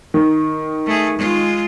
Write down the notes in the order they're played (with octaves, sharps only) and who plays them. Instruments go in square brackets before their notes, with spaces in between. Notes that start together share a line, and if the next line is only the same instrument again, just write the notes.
[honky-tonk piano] D#3
[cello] A3 G#4
G#3 F4